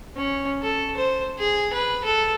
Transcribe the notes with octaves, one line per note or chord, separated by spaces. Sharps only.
C#4
A4
C5
G#4
B4
A4